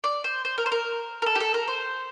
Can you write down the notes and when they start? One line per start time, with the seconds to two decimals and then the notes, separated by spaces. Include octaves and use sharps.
0.04 D5
0.24 C5
0.45 C5
0.58 A#4
0.66 C5
0.72 A#4
1.22 A#4
1.26 A4
1.35 G4
1.40 A4
1.54 A#4
1.68 C5